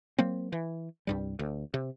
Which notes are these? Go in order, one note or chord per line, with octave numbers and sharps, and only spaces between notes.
F#3 A#3 C4
E3
C2 G2 G3
D2
C3